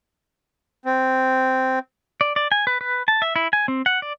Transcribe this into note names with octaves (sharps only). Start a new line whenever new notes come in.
C4
D5
D5
G#5
B4
B4
A5
E5
E4
G#5
C4
F#5
D5